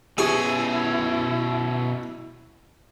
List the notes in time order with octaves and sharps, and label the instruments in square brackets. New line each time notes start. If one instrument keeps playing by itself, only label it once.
[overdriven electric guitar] B2 C#4 [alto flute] E4 [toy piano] G4 G#5 [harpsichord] G#4